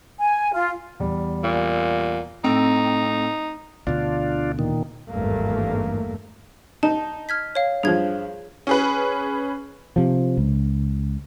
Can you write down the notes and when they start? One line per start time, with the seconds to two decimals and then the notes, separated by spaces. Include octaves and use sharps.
0.19 G#5
0.53 F4
1.00 E2 G3
1.44 A#2
2.44 A2 C4 D#4 E6
3.87 D2 B2 D3 D4 F4
4.59 A#2 D#3
5.10 G#1 E2 G2 A3 A#3
6.83 D#4 A5
7.29 F6 G#6 B6
7.55 C#5 F5
7.83 G2 F3 G#4 G#6
8.67 C#4 G#4 B4
9.96 C3 F3
10.38 C#2